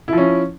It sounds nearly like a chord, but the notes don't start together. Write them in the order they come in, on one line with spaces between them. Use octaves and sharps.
E4 F3 C#4